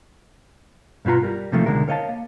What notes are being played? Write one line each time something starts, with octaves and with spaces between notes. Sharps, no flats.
G2 B2 B3 F4 A#5
G3 A#4
C3 D#3 F3 A3 A#3
C#2 B2 D3 G#3 A#4
A#4 C#5 D#5 F5 A5
A#3